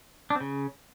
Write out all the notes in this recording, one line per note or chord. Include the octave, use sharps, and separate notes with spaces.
D4
C4
C#3